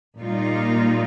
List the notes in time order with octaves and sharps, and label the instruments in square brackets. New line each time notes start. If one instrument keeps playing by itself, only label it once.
[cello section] A#2 G3 A#3 D#4 F4